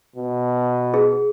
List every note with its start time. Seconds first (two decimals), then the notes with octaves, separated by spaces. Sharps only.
0.16 B2
0.94 G#4